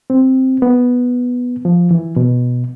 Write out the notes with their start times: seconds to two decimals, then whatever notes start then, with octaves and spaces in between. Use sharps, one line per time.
0.10 C4
0.62 B3
1.65 F3
1.91 E3
2.16 B2